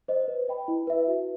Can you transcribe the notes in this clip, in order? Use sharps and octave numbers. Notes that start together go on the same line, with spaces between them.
C5 D#5
B4
D#5 G5 B5
E4
B4 E5
F#4